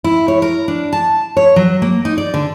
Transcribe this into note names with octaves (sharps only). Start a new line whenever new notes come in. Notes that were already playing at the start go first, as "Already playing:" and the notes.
E4
C#5
A#4
D4
A5
C#5
F#3
A#3
D#4
D5
D3